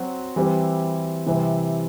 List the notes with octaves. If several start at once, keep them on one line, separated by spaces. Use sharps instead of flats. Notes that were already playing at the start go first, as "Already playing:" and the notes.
Already playing: F#3 C4 F#4
E3 G3 C4 E4 G4
C3 E3 G3 C4